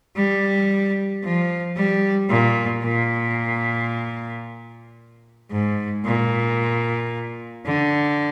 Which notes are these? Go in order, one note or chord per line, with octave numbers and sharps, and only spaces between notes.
G3
F3
G3
A#2
A#2
G#2
A#2
D3